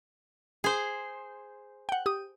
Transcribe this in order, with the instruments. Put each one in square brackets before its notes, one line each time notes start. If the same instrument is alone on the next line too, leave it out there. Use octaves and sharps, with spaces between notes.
[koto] G#4 C5
[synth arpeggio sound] F#5 G5
G4 D#6